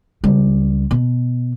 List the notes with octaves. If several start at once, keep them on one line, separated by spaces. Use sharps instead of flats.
C#2 G3
B2